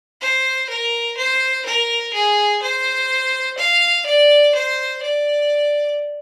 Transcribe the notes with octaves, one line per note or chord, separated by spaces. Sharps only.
C5
A#4
C5
A#4
G#4
C5
F5
D5
C5
D5